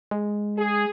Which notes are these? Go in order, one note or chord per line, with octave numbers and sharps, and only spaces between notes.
G#3
G#4